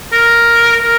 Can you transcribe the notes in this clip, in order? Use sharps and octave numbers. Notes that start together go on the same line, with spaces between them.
A#4
A#4